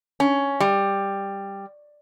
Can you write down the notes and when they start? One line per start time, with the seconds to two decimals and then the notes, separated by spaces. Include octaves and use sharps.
0.20 C#4
0.60 G3